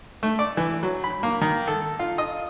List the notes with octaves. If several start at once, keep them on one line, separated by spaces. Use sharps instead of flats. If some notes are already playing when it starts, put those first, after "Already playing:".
A3
D5
E3
F#3
B5
A#3
D#3
A4
F4
D#5